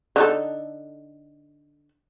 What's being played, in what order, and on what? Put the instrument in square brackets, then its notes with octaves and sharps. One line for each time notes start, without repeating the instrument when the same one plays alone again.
[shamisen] D3 D#4 A4